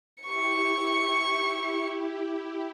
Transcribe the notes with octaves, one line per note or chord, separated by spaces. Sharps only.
E4 G4 C#6 C#7